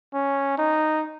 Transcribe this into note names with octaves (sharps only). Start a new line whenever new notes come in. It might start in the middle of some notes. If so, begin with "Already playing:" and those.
C#4
D#4